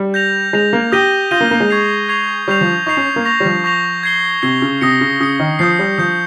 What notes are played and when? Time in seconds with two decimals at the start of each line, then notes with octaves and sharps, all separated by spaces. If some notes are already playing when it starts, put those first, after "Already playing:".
Already playing: G3
0.14 G6 A#6 F7
0.53 G#3 G6 A#6 F7
0.73 A#3
0.92 G4 D#6 G6 A#6 D#7 G7
1.31 F4 D#6 G6 A#6 D#7 G7
1.41 A#3
1.51 A#3
1.60 G#3
1.69 C#6 G#6 C7 F7
2.09 C#6 G#6 C7 F7
2.48 G3 C#6 G6 C7 F7
2.61 F3
2.86 D#4 C#6 G6 C7 F7
2.97 C#4
3.16 A#3
3.25 C#6 G6 A#6 F7
3.40 G3
3.45 F3
3.64 C#6 G6 A#6 F7
4.03 G#6 C7 G7
4.42 C3 G#6 C7 G7
4.62 C#3
4.81 C3 D#6 A#6 C#7
5.01 C#3
5.20 C#3 D#6 A#6 C#7
5.40 D#3
5.59 F3 D#6 G6 C7
5.79 G3
5.98 F3 D#6 G6 C7